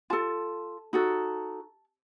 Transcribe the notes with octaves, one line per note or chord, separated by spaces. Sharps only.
F4 A4 A5
D#4 F#4 A4